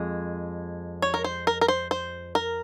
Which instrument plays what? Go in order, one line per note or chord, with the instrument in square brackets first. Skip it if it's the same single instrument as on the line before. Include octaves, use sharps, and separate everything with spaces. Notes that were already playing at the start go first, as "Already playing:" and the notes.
Already playing: [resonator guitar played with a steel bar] F2 G#3
[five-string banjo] C#5
A#4
C5
A#4
A#4
C5
C5
A#4